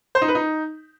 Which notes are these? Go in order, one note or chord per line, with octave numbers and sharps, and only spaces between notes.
C5
D#4
B4
D#4